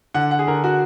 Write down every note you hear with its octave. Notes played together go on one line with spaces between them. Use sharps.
D3 F#5
F#5
G#4
D3 A#4
F#4